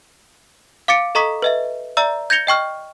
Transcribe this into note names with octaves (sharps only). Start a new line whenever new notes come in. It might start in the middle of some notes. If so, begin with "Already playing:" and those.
F5 D6 A6 C#7 D7
A4 D#5 A#5 C#6 D#6 B6
B4 D#5 E5
D5 E5 A#5 E6
G6 G#6 A#6 C#7 F7 G7
D#5 G5 C#6 F6